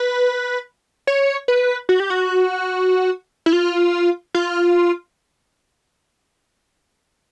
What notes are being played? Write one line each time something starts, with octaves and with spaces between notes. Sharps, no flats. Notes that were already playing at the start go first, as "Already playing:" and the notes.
Already playing: B4
C#5
B4
F#4
G4
F#4
E4
F4
F4